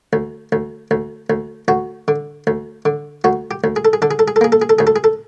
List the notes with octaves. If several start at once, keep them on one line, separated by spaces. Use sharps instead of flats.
D2
D2
D2
D2
D2 F#4
D3
D2
D3
D2 F#4
G4
D2
G#4
A4
G#4
D3 A4
G#4
A4
G#4
A4
A#3 G#4
A4
G#4
A4
D2 G#4
A4
G#4
A4